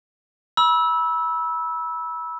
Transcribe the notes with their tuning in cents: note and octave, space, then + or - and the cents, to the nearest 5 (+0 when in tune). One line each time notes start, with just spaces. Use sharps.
B5 -30 E6 -10